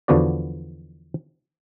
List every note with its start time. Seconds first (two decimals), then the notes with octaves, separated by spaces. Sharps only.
0.08 E2 D3 F3 B3 F#4 D5